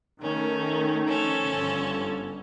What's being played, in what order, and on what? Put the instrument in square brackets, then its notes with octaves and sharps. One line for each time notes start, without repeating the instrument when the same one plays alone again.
[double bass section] D#3 A3 [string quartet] C#4
[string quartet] F3 C#4 A4
[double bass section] G1